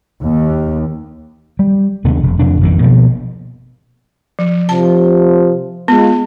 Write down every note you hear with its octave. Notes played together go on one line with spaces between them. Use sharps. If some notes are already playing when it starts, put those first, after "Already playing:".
D#2
G3
D#2 C3 B3 D4
F1
F2 C3 D4
G#1 F2 D#3
B2 F3 G#3 A#3
F3
C3 F3 A5
G#3 B3 F4